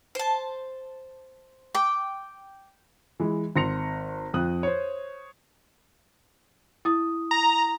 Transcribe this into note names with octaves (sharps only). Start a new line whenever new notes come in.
C5 A5
G5 D6
E3 G#3
G#1 C6 A#6 C#7 F7
F2 D#6 F#6
C5 C#5
E4 D#6
A#5